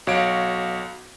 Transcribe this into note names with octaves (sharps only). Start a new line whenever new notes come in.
B1 F#4 C#5 F5 F#5 D7